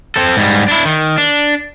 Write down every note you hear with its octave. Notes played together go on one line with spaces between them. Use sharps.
C4 A4
G#2 G3
D4 E4
D#3
D4